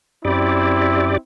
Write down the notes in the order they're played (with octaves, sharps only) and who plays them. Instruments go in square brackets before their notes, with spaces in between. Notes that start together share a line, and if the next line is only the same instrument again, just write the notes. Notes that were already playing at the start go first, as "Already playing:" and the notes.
[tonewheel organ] F#2 G4 D5 [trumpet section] C4 E4